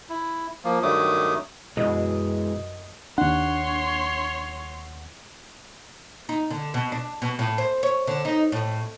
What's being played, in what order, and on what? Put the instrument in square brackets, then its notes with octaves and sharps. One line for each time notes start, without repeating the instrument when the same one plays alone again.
[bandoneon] E4
F3 A#3
G2 D#3 F#3 A3 D6 D#6
[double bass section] F#2 [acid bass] B2 [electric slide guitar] E3 G#3 [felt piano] D#5
[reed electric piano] D#2 F#5 [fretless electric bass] D4 [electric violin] C#5 C6
[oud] D#4
D3
B2
D4
B2
A2
C5
C#5
D3
D#4
A2